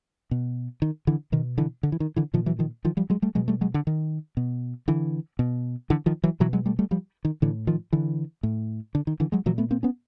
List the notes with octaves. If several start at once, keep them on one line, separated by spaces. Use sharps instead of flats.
B2
D#3
D3 E3
B2 D#3
D3 E3
D3
E3
D#3
D3 E3
A#2 D#3 F3
E3 F#3
D#3 F3
D#3 F3
F3 G3
F#3 G#3
G3 A3
B2 F#3 G#3
G3 A3
F#3 G#3
D3
D#3
B2
D3 E3
B2
D3 E3
D#3 F3
E3 F#3
B2 E3 F#3
F#3 G#3
G3 A3
G3 A3
F3 G3
D#3
A2 D3 E3
D#3 F3
D3 E3
A2
D3
D#3
D3 E3
F#3 G#3
A#2 E3 F#3
A3 B3
A#3 C4
B3 C#4